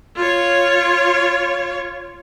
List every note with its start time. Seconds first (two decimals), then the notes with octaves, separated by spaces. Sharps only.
0.16 F4 C#5